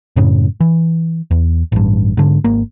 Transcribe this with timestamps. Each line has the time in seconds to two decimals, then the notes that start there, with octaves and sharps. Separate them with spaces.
0.16 F#2 A2 C#3
0.60 E3
1.31 E2
1.72 A1 G2
2.17 G#2 D3
2.44 G#1 A#3